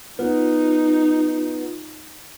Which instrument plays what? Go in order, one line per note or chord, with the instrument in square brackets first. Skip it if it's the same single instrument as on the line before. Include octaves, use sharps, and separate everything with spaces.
[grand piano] B3 [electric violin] D#4 [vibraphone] F4